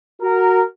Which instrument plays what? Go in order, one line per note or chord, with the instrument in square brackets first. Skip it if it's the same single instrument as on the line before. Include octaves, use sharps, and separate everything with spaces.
[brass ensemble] F#4 A#4